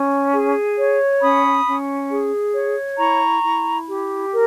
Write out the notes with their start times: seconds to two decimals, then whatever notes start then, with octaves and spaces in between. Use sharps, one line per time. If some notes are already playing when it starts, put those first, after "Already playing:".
Already playing: C#4
0.33 G#4
0.77 C#5
1.21 C#4 B5 D#6
1.66 C#4
2.11 G#4
2.55 C#5
2.98 E4 A#5 C#6
3.43 E4
3.88 G4
4.32 A#4